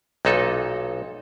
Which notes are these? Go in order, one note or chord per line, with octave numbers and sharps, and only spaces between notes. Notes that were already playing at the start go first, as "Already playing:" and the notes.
B1 A#2 D#4 A4